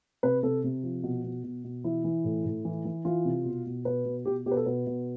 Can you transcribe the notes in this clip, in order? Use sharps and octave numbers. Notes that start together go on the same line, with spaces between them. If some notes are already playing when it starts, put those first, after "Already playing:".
C3 B4
C3 A4
C3
F3
B2
B2
B2
B2
E3 E4
E3
A2
A2
E3
E3
E3 F4
C3
B2
B2
B2 B4
B2
B2 G4
B2 G4
B4
A4
B2 B4
B2